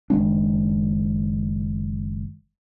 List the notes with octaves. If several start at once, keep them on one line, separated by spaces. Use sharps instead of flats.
F#1 D#3 G#3 D4